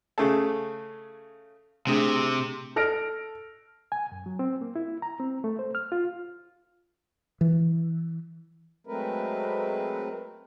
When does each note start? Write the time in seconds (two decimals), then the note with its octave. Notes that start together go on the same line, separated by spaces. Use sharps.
0.18 C#3 A3 G#4 A4
1.87 C3 A3 D4 G#4
2.76 A4 F6 A#6 D7
3.92 G#5
4.12 F#2
4.26 F#3
4.39 C4
4.61 A#3
4.76 E4
5.02 A#5
5.20 C4
5.44 A3
5.59 C5
5.75 F6
5.92 F4
7.41 E3
8.87 F#3 G#3 A3 C4 A#4 B4